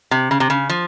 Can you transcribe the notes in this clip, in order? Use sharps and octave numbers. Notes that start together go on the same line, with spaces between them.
C3
C#3
C3
C#3
F3